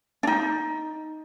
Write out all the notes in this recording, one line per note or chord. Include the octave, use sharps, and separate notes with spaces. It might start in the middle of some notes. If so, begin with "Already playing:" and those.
D4 D#4